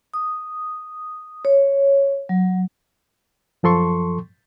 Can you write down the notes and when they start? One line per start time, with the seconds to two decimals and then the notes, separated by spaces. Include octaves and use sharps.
0.14 D#6
1.45 C#5
2.29 F#3
3.63 F#2 F3 A4 C6 C#6